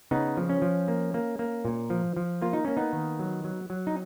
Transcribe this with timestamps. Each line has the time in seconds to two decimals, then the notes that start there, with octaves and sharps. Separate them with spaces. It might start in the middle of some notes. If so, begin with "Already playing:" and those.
0.11 C#3 B3 D#4
0.37 F3
0.49 C#4
0.62 F3
0.88 A#3
1.14 A#3
1.39 A#3
1.65 A#2
1.90 F3
2.17 F3
2.42 A#3 F4
2.53 D#4
2.65 A#3 C#4
2.77 B3 D#4
2.93 D#3
3.19 F#3
3.44 F#3
3.70 F#3
3.87 D#4